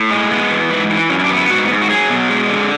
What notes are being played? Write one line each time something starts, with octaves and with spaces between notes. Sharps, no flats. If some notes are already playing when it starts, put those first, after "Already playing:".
Already playing: A2
G#3
B3
E3
G#2 B4
E3
F#2 C#4
E4
D4
B3
E4
G#2 F#4
G#2
F#4
F#3 G#4
B2
G#3
D3